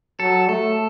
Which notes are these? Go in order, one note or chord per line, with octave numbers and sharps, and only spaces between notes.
F#3 A4
A3 A4